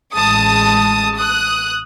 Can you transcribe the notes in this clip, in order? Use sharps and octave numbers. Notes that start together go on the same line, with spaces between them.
A1 G#3 A5 D#6
D#6 F#6